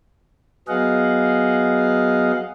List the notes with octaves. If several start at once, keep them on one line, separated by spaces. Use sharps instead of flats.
F#3 B3 G#4 D#5 F5 F#5